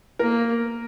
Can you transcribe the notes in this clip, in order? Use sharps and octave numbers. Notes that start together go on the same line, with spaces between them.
A#3 A#4